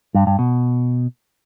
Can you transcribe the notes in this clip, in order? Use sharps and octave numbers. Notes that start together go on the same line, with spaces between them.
G2
G2
B2